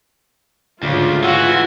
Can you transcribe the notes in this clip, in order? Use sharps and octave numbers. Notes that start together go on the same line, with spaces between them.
D2 G#2 C#3 F4
E3 F#4